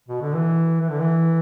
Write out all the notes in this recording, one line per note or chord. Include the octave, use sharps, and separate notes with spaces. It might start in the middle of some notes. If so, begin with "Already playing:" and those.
B2
D3
E3
E3
D3
E3